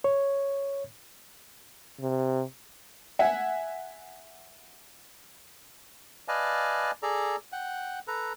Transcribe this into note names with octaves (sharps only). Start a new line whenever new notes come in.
C#5
C3
E5 F#5 G#5
B4 D5 D#5 F5 G#5 A5
G#4 A4 D5 A#5
F#5 G5
A4 B4 A#5